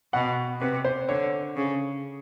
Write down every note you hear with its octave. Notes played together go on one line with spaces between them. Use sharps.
B2 F#5
C3 B4
C5
D3 C#5
C#3